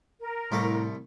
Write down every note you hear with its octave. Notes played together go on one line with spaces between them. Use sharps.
A#4
C2 A2 A3 D6